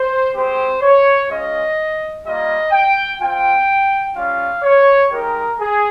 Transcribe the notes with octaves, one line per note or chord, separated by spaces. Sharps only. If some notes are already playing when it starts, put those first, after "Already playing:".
Already playing: C5
G#3 C4 G4 C5
C#5
G#3 C#4 F4 D#5
G3 A#3 F4 D#5
G5
C4 F4 G5
G3 C#4 F4 F5
C#5
G#3 D#4 G4 A#4
G#4